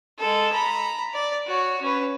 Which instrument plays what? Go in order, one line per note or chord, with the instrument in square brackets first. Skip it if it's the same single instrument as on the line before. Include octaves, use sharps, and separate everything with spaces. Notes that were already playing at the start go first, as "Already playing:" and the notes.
[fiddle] G#3 A4
A#5 B5
D5
F#4 C#5
C#4 B4